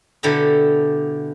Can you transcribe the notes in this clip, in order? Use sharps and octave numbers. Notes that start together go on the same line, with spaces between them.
B2 D3 E4 G4 A4 A#5